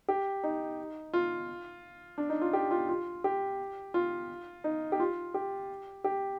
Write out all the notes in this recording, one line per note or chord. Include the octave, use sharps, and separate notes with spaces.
G4
D#4
F4
D4
D#4
F4
G4
F4
F4
G4
F4
D#4
G4
F4
G4
G4